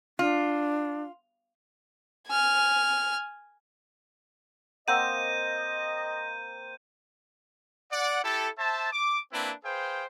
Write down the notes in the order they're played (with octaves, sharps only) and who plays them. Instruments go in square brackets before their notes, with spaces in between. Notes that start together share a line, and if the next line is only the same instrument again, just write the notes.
[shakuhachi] D4 [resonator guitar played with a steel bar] F4
[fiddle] G#5 F6
[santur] A#3 C4 F5 [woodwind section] D#5 [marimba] F#5 E6 [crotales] G6 D#7
[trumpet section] D5 F#5
E4 G4 A4
C5 E5 A5
D6
A#3 C4 D4 E4 B4
G#4 B4 C5 F5 G5